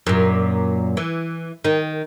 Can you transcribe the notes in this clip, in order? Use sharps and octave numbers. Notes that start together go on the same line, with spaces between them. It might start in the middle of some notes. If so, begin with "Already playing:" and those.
F#2 A#2
E3
D#3